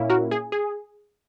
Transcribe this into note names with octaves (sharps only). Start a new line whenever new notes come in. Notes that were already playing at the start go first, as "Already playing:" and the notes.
Already playing: A#2 A#3 C#4 E4
F#4 A#4
G#4
G#4